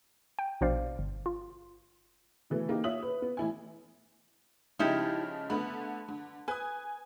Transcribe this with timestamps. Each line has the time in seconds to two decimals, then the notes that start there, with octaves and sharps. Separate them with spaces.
0.39 G5
0.61 A#1 B2 D4 C5 D5 F5
0.99 G1
1.26 F4
2.50 B2 E3 A3
2.69 A#3 D#4 G4
2.84 F4 C#5 E5 D#6 F#7
3.02 B4
3.22 B3
3.37 A1 E4 G#5
4.79 C#3 F3 G#3 D#4 E4 G4
5.50 D3 A3 B3 B5
6.09 D3
6.48 B4 G#5 D#6